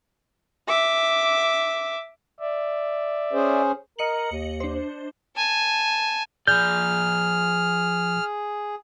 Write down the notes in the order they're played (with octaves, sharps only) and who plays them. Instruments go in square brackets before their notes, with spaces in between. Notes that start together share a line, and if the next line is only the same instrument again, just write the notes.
[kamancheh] E5 D6
[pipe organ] D5 E5
[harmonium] C#4 G#4 C5
[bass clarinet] A#4 [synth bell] D#5 C#7 F#7
[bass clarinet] D#2
[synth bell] D4 C5
[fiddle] G#5 A5
[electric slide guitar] F3 D5 [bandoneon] G#4 [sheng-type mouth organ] F6 [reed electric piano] G6